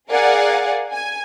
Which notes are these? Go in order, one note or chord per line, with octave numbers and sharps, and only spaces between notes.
G#4 A#4 D5 F5 F#5 G#5
G#5